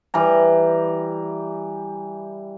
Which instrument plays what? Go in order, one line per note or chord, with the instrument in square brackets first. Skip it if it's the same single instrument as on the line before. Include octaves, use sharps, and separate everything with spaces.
[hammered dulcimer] E3 G3 A#5